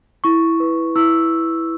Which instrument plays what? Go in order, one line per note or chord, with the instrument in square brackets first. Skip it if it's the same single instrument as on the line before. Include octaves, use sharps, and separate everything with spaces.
[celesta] E4 C#6
B4
E4 E6